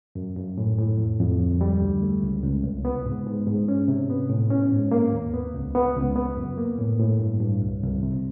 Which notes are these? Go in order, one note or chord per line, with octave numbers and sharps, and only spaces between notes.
F#2
F#2
A2
A2
F2
F2
D2
G3
D2
A3
C#2
C#2
C2
B3
G#2
G#2
G#2
C#4
C3
B3
A2
C#4
G#2
A#3
D#2
B3
C#2
B3
C#2
B3
F#2
A#3
A2
A2
G2
G2
C2
C2
C3